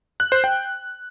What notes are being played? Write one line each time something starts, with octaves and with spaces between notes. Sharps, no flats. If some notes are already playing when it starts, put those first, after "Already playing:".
F#6
C5
G5